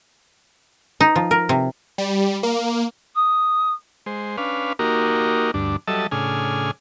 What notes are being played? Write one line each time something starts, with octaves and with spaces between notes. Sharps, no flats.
D#4
F3
A#4
C3
G3
A#3
D#6
G#3 C5
C#4 D4 B4 F5
A#3 D#4 F#4 G4 A#4
D2 G2 D4
F#3 G3 A4 D#5 E5 A5
A2 C#3 D4 G#4 G#5 F6